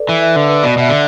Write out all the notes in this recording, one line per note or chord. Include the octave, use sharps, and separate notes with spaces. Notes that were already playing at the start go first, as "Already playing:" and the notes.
Already playing: A4 B4 D5
E3 E5
E5
D3 B4
B4
B2 D5
B2 E5
D3